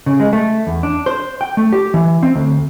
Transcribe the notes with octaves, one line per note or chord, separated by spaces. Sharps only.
C#3
G#3
A3
E2
D4
C5
G5
A3
G4
E3
C4
D2